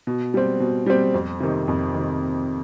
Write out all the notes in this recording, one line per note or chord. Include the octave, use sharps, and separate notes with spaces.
B2
G3 C4
B2
G3 C4
F2
C3 D#3
F2
C3 D#3